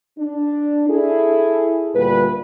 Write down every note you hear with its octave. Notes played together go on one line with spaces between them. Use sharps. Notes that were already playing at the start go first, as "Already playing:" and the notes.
D4
E4 G#4 A4
D2 A#2 G3 B4